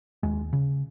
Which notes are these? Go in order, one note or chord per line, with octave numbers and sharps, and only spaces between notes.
D#2 G#3
C#3